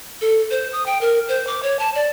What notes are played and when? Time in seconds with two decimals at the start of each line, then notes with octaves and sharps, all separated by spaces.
0.21 A4
0.51 C5
0.73 D#6
0.86 G5
1.01 A#4
1.29 C5
1.47 D6
1.63 C#5
1.79 A5
1.95 D5